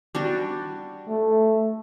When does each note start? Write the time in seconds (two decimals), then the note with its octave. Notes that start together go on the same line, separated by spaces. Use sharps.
0.15 G3 D4 F#4
1.09 A3